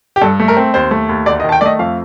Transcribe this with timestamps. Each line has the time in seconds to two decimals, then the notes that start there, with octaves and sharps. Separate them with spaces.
0.16 G4
0.22 G2 A4
0.40 A3
0.48 A#4
0.57 C4
0.74 D#2 C5
0.91 A3
1.09 D#2
1.26 D2 D5
1.40 D#5
1.44 D#3
1.49 A5
1.52 G5
1.61 A3 D5 D#5
1.79 F2 F5